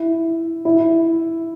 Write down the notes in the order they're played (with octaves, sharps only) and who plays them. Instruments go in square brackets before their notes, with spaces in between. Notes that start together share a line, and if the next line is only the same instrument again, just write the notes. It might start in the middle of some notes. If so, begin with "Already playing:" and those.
Already playing: [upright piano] E4
E4